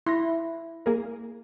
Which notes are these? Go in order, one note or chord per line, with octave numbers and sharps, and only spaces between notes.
E4 C6 A#6
A#3 G#4 A#4